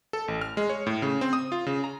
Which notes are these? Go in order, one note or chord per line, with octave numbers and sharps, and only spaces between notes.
A4
A1
F6
G#3
C#5
A2
C#3
C4
D#6
F4
C#3
A#5